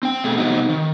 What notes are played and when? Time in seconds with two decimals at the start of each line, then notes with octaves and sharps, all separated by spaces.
0.03 C4 G5
0.24 B2 A3 G#4
0.38 C3 G3 B3 C4 D#4 F#4
0.70 D#3